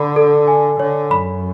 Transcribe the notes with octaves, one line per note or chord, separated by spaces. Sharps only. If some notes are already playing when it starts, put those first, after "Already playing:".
Already playing: D3 B5
A4
G#5
D3 C#5
F#2 B5